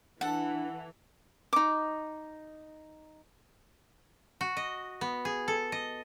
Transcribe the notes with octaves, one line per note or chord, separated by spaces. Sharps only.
E3 D4 A4 F#5
D#4 D6
F#4
D#5
B3
G#4
A4
D#5